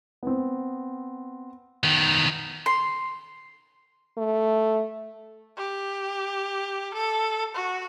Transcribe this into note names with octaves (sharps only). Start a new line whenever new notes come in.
B3 C4
D#3 B3
C6
A3
G4
A4
F#4